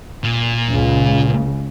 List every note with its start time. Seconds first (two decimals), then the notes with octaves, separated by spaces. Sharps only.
0.24 A#2
0.69 C#2 C#3